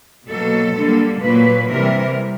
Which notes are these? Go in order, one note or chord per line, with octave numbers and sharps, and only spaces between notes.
B2 F#3 A#3 A4
D3 G3 A#3
A#2 F#3 A#3 B4
C3 E3 G3 A#4